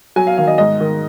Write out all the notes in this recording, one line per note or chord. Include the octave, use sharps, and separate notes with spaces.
F#3 G#5
F5
D#3 F5
D#5
G#2 D#5
D#3